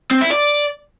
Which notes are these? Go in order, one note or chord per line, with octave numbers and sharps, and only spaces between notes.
C4
E4
D5